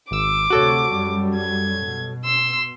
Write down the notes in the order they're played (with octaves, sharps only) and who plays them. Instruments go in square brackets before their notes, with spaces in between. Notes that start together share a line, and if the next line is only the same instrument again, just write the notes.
[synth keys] G#1 E6 [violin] D6
[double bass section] D2 C3 [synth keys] F#4 A4 C#5
[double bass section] F#2 G3
[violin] G#6
[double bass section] B2
[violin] C6 E6